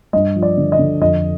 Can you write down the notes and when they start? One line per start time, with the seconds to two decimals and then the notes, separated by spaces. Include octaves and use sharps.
0.13 G2 D#5
0.36 F3
0.42 D5
0.57 D3
0.72 D#5
0.79 D3
1.01 F2 D#5